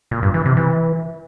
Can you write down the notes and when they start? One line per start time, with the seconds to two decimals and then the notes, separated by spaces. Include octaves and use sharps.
0.11 A#2
0.23 G2
0.34 E3
0.45 C3
0.57 E3